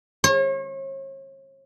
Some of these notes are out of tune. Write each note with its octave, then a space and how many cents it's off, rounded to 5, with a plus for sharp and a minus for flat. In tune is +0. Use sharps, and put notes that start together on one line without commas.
C#5 -40